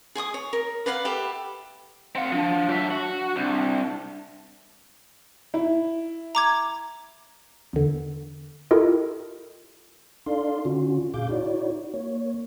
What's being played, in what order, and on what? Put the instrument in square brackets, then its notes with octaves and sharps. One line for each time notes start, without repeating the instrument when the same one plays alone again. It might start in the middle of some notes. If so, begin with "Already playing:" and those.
[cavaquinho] G#4 G#5 C#6 D#6
C#5
A#4
B4 D5 F5 F#5
G4 A4 E5 B5
[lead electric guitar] C4 F#5 [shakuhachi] F5
[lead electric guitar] F3 [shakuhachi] D4
[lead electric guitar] F#3 E5
F#4
[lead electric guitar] C2 [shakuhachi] D4
[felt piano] E4
[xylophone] A#5 D6 G#6
[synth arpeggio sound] E2 D3
E4 F4 G4 A4 A#4 D#5
[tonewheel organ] D4 D#4 A4 D5 F5 C6
D3 C#4 F4 F#4
A#2 G#4 F5 D6 G6
D#4 E4 F#4 C#5 D5
A#3 C#5